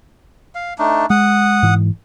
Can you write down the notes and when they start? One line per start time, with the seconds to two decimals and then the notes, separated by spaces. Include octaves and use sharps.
0.55 F5
0.78 A3 D4 D#4
1.10 G#3 F#5 D#6
1.63 G#2 E3